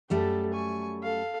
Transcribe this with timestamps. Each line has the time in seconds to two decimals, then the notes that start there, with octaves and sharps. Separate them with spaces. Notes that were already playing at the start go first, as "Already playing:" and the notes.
0.10 F#2 G3 A3 G4 A4
0.54 G#5 C#6
1.03 A4 F5